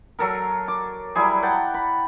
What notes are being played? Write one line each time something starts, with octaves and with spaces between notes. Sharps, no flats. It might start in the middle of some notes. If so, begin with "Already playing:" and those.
F#3 A4 A#4
D6
F#3 G3 E4 G#4
F#5 G5 A5
B5